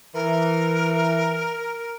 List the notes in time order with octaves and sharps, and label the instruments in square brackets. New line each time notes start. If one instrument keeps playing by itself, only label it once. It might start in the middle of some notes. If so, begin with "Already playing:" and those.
[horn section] E3 [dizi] A#4